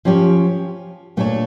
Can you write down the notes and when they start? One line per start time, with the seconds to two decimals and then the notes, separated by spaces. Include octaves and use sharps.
0.05 F3 C#4 G4 C#5
1.17 A#2 A3 D4 A4 C#5